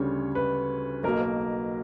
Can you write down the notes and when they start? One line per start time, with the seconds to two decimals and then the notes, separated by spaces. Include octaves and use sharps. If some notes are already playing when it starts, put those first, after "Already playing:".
Already playing: D2 C#3 G3 C#5
0.35 B4
1.04 B1 B2 A#3 A#4
1.21 A#4